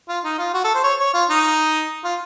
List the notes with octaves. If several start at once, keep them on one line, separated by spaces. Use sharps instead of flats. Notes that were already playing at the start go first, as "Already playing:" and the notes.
F4
D#4
F4
F#4
A4
C5
C#5
C#5
F4
D#4
F4